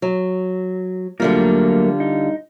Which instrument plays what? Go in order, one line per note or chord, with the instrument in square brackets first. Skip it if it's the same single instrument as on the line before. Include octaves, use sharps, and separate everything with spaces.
[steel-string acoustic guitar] F#3
[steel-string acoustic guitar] D3 G3 F4 [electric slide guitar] F#3 A3 A#3
[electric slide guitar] D#4